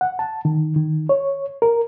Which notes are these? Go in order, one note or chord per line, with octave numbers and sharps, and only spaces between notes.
F#5
A5
D#3
D#3
C#5
A#4